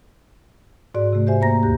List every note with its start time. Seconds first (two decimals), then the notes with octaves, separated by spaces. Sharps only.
0.94 G#2 F#4 D5
1.13 C3 A3
1.27 G4 C5 E5 G#5
1.41 A#3 C5 A#5 A#6
1.63 D#2 G4